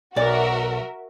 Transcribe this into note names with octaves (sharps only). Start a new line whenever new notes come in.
B1 F#4 A#4 D5 E5